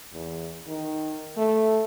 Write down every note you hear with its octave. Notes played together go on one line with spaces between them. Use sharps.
E2
D#3
A3